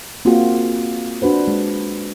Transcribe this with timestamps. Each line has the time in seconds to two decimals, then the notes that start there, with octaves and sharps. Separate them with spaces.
0.25 A#3 C4 F4 F#4 G#4
1.22 D4 F#4 B4 C5
1.48 G#3